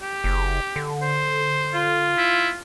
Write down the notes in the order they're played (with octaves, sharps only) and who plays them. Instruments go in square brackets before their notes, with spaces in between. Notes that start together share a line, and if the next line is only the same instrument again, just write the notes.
[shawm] G4
[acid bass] F#1
D3
[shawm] C5
[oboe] F4
[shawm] E4